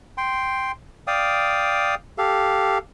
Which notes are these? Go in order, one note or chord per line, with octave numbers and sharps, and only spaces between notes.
G5 C6
D5 F5 G5 D#6
G4 A4 F5